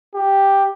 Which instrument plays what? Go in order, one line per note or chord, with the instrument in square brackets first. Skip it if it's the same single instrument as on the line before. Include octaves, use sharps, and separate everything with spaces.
[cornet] G4